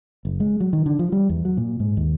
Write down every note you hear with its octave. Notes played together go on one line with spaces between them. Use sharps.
F#1
G#3
F#3
D#3
D3
F3
G3
E2
F#3
A#2
G#2
D#2